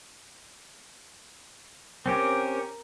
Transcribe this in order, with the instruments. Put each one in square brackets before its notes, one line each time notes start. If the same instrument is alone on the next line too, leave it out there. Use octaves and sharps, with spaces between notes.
[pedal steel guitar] C4 C#4 G4 [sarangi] A#4